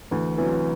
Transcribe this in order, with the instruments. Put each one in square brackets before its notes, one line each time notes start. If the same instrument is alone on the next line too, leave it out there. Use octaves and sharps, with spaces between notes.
[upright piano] D2 [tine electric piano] E3
[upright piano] C3 F#3 [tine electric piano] E3